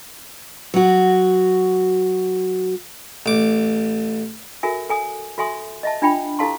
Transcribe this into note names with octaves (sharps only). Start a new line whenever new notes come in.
F#3 F#4
A1 D6
F#4 A4 A#4 E5 G#5
A4 G#5 D#6
F#4 A4 E5 G#5 C6 D#6
D#5 E5 A5
D4 F4 G5 B5
E4 G4 A4 F5 A5 C6